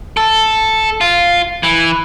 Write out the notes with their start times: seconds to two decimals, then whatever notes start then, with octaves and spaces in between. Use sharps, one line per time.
0.17 A4
1.01 F4
1.63 E3